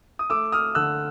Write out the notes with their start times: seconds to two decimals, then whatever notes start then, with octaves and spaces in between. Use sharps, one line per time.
0.19 D#6
0.30 A3 D6 E6
0.52 D#6 F6
0.75 D3 E6 F#6